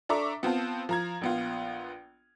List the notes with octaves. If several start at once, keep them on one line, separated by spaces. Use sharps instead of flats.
D4 A4 E5 A#5 C#6 D6
B3 C4 F4 A5
F3 A#5 G#6
A#1 B3 F4